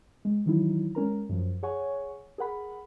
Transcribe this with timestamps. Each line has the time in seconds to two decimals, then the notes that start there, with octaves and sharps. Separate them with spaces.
0.25 G#3
0.46 D#3 E3 F#3 D#4 E4
0.95 G#3 C#4 A#4 A#5
1.29 F#2 F3
1.63 G#4 C#5 F#5 G#5 C#6
2.38 G#4 A#4 F#5 B5